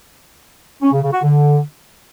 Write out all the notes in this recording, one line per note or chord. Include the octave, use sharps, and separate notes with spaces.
C#4
C#3
C#3
F#4
D3